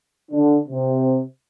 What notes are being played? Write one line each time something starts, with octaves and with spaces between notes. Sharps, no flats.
D3 D4
C3 C4